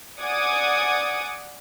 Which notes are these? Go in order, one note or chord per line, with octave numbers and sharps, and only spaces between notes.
D5 F#5 G#5 D6 D#6 G#6